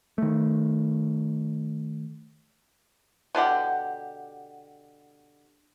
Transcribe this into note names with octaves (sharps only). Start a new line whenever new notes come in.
D#3 A3
B2 D3 G4 F#5